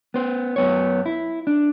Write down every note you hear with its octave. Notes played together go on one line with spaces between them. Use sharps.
B3 C5
F#2 B3 C#5
E4
D4